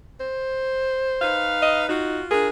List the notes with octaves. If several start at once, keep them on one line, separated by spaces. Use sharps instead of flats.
C5
D#4 B4 F5
D#5
D#4 F4 F#4
D4 F4 G#4 A#4